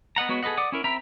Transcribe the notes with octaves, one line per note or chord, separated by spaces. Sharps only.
B3 D#5 F#5 A#5
G#3 B3 F#4 C#5 D#5
G#4 A4 B4 D#5 F#5
D5 F#5 D6 D#6
C#4 E4 A#4
C4 E5 G5 A#5 B5